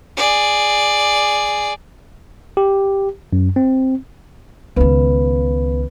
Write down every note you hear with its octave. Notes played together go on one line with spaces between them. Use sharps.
G#4 D5
G4
F#2
C4
C#2 D#3 B3 B4